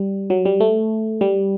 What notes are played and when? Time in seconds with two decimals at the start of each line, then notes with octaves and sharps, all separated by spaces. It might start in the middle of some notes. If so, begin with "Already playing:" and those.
Already playing: G3
0.30 F#3
0.45 G3
0.60 A3
1.21 G3